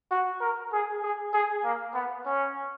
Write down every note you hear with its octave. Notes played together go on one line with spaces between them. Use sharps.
F#4
A#4
G#4
G#4
G#4
A#3
B3
C#4